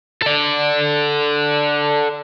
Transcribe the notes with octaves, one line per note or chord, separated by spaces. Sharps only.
A4 D5